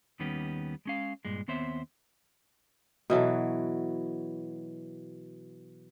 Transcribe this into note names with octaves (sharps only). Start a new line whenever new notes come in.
D#2 D#3 G3 B3 C#4
G#3 C#4 F5
G2 A#2 G#3
D#2 B3 C4 C5 C#5 E5
B2 E3 F#3 A4